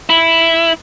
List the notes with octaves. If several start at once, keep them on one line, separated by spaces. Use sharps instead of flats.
E4